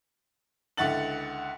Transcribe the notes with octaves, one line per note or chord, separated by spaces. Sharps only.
C#2 D3 E4 F#5 A6 F#7